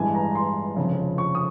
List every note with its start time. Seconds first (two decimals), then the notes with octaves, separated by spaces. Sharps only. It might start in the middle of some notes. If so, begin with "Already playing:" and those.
Already playing: A1 G2 E3 G#3 G#5
0.15 A#5
0.35 C6
0.77 F1 F2 C#3
1.18 C#6
1.35 D#6